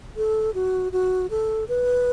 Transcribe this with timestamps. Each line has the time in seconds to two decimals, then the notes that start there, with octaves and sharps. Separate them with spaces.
0.17 A4
0.54 F#4
0.92 F#4
1.30 A4
1.69 B4